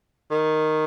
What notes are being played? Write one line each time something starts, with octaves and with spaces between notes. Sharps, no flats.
D#3